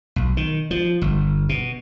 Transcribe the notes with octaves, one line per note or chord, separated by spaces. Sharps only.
B1
D#3
F3
G1
B2